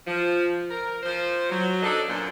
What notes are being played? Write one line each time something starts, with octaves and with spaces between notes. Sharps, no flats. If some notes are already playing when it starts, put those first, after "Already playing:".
F3
A#4
F3 C5
F#3
D4 D#4 A4
F#2 A#2 F3 A#3 B3 D4